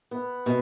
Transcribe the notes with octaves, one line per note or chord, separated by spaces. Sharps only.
B3
B2